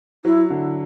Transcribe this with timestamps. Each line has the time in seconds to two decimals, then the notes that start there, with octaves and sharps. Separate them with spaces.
0.25 F#3 E4
0.50 D3